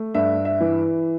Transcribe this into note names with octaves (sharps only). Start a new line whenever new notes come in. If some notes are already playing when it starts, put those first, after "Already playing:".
Already playing: A3
G2 E5
E5
E3